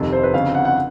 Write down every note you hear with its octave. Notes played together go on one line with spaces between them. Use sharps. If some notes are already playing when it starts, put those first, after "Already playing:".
Already playing: F1 F2 C3 D#3
C5
B4
G1 F2 C#3 F5
F#5
F#5